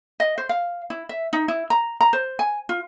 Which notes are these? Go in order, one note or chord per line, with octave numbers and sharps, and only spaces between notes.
D#5
C5
F5
E4
E5
D#4
E4
A#5
A#5
C5
G#5
F4